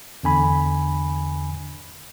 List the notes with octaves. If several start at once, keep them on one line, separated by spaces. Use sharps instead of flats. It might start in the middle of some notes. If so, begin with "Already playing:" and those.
E2 D3 G#5 B5